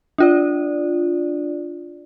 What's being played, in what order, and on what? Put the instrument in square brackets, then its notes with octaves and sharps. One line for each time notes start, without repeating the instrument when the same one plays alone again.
[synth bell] D4 F4 D5